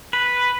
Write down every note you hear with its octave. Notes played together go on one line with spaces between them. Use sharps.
B4